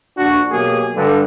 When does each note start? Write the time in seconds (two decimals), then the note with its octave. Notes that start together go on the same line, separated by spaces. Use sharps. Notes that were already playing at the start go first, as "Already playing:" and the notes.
0.17 A#1 D4 F#4
0.52 B2 F#3 A#3 G4 G#4
0.95 G2 D3